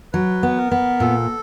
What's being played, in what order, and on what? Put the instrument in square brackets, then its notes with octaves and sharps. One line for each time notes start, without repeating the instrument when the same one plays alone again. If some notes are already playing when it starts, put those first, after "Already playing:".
[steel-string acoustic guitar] F#3 [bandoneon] B4
[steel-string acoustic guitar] B3
[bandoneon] A#4
[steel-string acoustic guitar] B3
[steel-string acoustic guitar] A#2 [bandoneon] A4